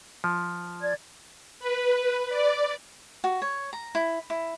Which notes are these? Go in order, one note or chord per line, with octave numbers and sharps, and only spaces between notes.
F3
D5 G#6
B4
D5
F#4
C#5
A#5
E4
E4